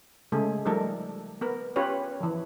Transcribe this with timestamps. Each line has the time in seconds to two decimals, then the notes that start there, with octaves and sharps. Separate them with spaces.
0.32 C#3 G#3 A3 G#4 A4
0.65 F3 G3 A3 D#4 A4 A#4
1.41 B3 A#4
1.76 C#4 F4 G4 B4 C#5
2.20 E3 F3